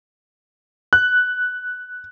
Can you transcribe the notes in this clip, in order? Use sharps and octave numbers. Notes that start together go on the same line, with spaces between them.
F#6